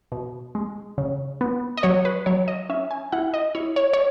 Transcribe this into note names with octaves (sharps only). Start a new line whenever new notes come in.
B2
G#3
C#3
B3
D#5
F#3 C#5
B4
F#3 C#5
D#5
C#4 E5
G#5
E4 F#5
D#5
E4 C#5
C#5
C#5